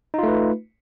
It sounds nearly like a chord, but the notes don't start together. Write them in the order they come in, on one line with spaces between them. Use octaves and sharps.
D#4 F4 A3 B4